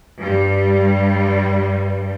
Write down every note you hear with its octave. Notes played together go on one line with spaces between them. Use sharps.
G2 G3